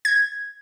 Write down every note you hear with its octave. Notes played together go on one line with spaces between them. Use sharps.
G#6